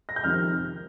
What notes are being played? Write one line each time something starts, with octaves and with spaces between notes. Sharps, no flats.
A#6
G6
F2 C3 D#3 F6